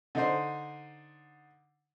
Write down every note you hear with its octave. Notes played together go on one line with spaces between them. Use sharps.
D3 D#4 C5